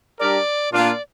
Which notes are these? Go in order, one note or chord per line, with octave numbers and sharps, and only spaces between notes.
G3 D4 G4 A#4 D5
A#2 A#3 D4 F4 D5